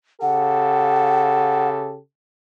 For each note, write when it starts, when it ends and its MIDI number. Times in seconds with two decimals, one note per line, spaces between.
0.22 1.99 49
0.22 1.99 67
0.22 1.99 69
0.22 1.69 78